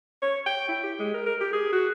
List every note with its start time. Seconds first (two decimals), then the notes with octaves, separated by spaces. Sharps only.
0.22 C#5
0.46 G5
0.69 E4
0.84 G4
0.99 G#3
1.14 A#4
1.26 A#4
1.41 G4
1.53 G#4
1.73 F#4